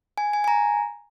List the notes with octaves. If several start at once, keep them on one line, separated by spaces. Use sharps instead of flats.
G#5
G#5
G#5
A#5